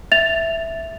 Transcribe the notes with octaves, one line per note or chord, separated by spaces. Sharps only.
E5 A6 F7